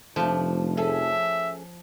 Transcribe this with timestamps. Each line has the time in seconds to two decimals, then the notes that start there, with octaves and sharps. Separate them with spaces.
0.16 F1 F3 A3 D4
0.77 C#4 G#4 A4 E5